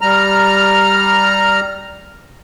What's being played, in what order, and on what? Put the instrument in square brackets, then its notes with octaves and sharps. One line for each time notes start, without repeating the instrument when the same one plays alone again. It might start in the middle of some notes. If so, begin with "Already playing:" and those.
[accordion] G3 A#5 F6